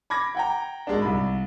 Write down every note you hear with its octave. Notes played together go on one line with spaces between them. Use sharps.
B5 D6 G#6 A#6
F#5 G5 A#5
G#1 G#3 D4
C2 B5